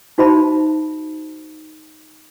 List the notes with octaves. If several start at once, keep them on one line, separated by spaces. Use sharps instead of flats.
D#4 F#4 C5 E5 A5 B5